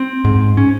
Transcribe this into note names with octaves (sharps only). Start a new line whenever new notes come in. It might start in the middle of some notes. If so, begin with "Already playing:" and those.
Already playing: C4
G#2
C#4